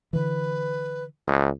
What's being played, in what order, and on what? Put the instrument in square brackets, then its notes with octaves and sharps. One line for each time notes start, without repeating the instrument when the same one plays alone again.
[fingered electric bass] D3 E3 [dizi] B4
[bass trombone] C#2